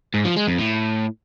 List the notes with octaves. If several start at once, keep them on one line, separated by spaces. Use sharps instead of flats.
G#2
F3
G#3
F2
A2